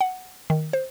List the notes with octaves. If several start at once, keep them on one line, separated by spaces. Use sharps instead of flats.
F#5
D#3
C5